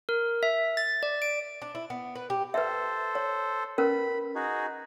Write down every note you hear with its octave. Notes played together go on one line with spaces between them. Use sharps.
A#4
E5
A6
D5
D7
D4
E4
B3
B4
G4
A4 B4 C5 E5
C#5
C#4 A#4 B4 B5
D#4 F#4 G#4